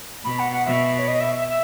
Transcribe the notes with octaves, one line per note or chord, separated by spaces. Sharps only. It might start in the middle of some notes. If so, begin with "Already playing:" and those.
B2 B5
F#5
F#5
B2 E5
C#5
D#5
E5
E5
E5